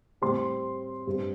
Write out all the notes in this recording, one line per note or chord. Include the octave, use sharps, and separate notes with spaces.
A2 G3 C4 C6
G2 G3 C4